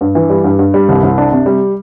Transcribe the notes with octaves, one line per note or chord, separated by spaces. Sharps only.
G2
E3
G3
G2
G2
G3
C2
C2
D4
C3
G3